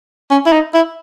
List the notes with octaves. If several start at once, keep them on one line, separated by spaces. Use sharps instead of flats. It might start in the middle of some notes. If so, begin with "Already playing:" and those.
C#4
E4
D#4
E4